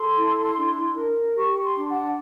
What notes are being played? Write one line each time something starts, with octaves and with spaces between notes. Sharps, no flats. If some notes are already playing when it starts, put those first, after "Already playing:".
Already playing: A4 C6
E4
D4
A#4
G4 C#6
C6
D4
F#5